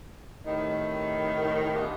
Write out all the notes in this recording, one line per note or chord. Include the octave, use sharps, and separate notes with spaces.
A2 C3 D#3
B3 D4 F4 G4 G#4